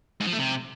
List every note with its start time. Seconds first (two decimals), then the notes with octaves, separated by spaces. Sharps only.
0.20 G#2
0.27 F3
0.33 A3
0.39 C3